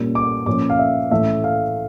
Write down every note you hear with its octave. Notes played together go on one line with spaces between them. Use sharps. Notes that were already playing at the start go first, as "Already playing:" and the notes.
Already playing: A#2 G3 C#4
D6
A#2 F3 C#4 D6
F5
E5
A2 E3 A3 C#4 E5
F5